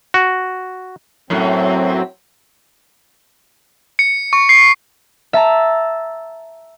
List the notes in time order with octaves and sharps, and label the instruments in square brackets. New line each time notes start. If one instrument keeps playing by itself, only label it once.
[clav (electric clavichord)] F#4
[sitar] F#2 A2 [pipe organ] F#3 C4
[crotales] C#7
C#6
C7
[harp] E5 A5 A#5